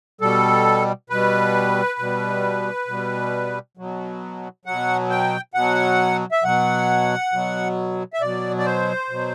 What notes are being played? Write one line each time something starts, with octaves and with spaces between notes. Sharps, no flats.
B2 G3 A4
B2 G3 B4
B2 G3
B2 G3
B2 F#3
B2 F#3 F#5
G5
B2 F#3 F#5
E5
B2 F#3 F#5
B2 F#3
E5
B2 F#3 D5
D5
C5
B2 F#3